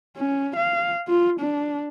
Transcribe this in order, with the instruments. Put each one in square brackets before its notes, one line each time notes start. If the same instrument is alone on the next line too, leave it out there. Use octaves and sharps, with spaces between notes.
[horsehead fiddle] C#4
F5
F4
D4